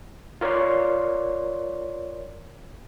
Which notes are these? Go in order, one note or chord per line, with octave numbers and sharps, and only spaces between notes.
F4 A#4 C#5 D5 C6